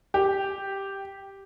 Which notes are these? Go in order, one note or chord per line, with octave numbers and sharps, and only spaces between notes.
G4